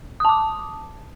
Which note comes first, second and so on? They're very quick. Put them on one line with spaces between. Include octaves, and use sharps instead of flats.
D#6 A5 D6